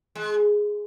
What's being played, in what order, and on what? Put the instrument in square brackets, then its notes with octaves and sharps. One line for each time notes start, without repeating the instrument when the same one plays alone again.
[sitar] G#3